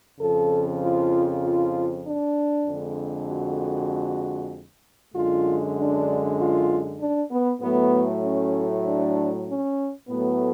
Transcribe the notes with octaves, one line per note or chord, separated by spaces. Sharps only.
F2 C#3 F3 A4
F4
F4
D4
F2 D3 G#3
F#4
F#2 D3 G#3 F4
D4
F4
D4
B3
A2 F#3 A3 B3
C#4
D4
C#4
A2 F#3 A3 B3